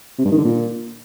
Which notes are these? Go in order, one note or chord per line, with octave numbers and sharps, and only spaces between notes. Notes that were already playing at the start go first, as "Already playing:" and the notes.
C3
G2
D#3
D3
A#2